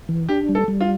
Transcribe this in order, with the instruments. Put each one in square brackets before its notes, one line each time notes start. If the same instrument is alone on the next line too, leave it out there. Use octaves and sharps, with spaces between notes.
[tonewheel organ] E3
[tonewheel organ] D4 [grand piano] G4
[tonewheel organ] G3
[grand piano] A4
[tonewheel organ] G3
[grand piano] F4